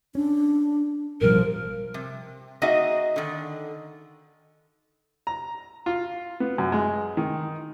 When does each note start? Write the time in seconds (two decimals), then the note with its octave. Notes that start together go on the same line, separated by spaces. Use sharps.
0.15 C#4 D4
1.21 A1 B2 F3 G3 A#4
1.94 C3
2.62 A#3 D#4 F#4 G#4 D#5 E5
3.16 D3 D#3
5.27 A#5
5.86 F4
6.40 B3
6.58 F#2
6.72 G#3
7.17 D#3